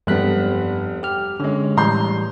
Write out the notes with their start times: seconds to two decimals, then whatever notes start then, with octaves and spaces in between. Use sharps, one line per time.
0.07 F1 G2 G3 B3 F#6 B6
1.03 G4 F6
1.40 D3 G#3 C#4
1.77 A2 E3 G3 A#5 C6 G6